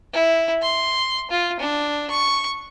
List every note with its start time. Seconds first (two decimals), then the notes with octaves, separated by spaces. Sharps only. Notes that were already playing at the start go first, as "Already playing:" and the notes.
0.13 E4
0.62 C6
1.31 F4
1.60 D4
2.10 C#6